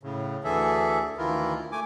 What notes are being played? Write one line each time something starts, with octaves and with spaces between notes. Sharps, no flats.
A2 C#3
D2 D3 E3 G#4 A4 E5
D2 D#3 E3 E4 F4 A#4
A3 G#5 D6